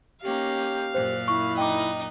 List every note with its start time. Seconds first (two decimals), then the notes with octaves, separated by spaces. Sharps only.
0.22 A#3 C#4 D#4 G4 F5
0.95 F#2 A#2 C5 F#6
1.28 E4 C#6
1.58 D#4 D#5 G5 D6